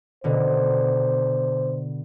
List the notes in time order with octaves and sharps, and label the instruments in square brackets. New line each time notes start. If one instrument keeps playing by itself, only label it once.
[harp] B2 D3 [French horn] C5